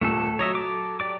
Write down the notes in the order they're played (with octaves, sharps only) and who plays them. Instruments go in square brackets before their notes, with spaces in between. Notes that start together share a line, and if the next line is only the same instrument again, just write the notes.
[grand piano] D#1 A#2 [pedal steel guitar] A3 A4
[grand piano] F#3 [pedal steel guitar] C#5 D#5 E5
[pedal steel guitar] A4 D6
G4 D5 D6